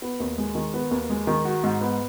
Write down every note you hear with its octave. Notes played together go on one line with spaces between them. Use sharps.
B3
D#2
G#3
D#3
B3
D#2
G#3
D#3
F#4
G#2
B3